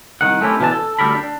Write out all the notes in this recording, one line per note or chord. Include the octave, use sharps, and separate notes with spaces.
C2 D#3 F#5
A3 C4 C#4 E4 G4
B2 D3 E3 D4 G#5 A5
A4
D2 G3 A4 A#4 B5
D4